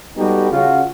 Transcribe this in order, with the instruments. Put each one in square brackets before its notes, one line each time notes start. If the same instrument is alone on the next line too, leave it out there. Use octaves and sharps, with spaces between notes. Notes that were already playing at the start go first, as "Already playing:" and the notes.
[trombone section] G3 B3 D#4 F#4 G4 A4
C#3 C#4 F4 F#4